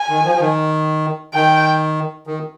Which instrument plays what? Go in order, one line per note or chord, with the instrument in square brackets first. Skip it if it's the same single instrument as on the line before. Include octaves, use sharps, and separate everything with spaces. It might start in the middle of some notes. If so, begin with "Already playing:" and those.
Already playing: [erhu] G#5
[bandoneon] D#3
F3
F3
D#3
[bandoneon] D#3 [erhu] G5
[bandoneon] D#3